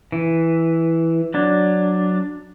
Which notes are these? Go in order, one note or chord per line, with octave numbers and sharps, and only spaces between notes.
E3
F#3 D4